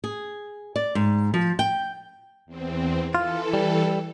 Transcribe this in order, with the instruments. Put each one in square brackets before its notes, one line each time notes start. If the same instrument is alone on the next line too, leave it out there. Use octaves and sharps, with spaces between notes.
[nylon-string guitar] G#4
D5
G#2
F3
G5
[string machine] E2 C4
[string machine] E3 A4 [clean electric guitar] F4
[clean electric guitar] G3